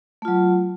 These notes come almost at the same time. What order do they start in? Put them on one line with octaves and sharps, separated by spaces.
A3 F4 F#3